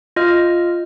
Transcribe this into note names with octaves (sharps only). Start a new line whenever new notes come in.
F4 D#5 F6